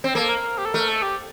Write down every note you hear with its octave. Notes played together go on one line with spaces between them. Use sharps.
C4
A#3 A4
A#4
G4
A4
A3 A#4
A4
G4